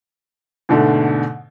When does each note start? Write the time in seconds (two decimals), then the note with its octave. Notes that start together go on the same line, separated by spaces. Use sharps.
0.69 G#2 B2 D3 A3